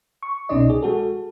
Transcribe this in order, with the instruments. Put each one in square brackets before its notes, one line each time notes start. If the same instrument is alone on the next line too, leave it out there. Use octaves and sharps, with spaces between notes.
[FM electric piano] C#6
C2 B2 C#4 D#4 D5 D#5
G#4
G#3 F#4 A4